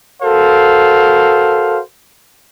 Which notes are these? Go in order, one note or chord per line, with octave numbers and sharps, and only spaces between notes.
F#4 A4 A#4 C5 F5